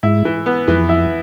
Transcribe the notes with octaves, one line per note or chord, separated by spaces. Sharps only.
G#2 E4
E3
B3
F2 E3
E4